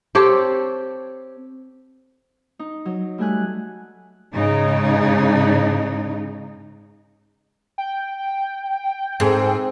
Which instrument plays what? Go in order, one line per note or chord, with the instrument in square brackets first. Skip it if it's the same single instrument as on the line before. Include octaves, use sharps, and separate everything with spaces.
[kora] C4 G4 A4 C#5
[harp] D#4
F#3
G3 A3 G#5 F#6
[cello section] G#2 C#3 D#4
[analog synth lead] G5
[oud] G#2 [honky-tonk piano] C4 G#4 A4